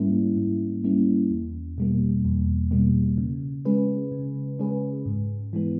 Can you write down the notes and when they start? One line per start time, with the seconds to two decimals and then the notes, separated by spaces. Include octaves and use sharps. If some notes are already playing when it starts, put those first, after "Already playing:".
Already playing: G#2 G3 A#3 C#4 E4
0.36 G#2
0.84 G3 A#3 C#4 E4
1.31 E2
1.78 B2 G3 A#3
2.25 E2
2.71 B2 G3 A#3
3.18 C#3
3.65 G#3 C#4 G#4 B4
4.12 C#3
4.59 G#3 C#4 G#4 B4
5.06 G#2
5.53 E3 G#3 B3